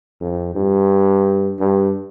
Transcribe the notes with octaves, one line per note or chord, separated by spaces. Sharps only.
F2
G2
G2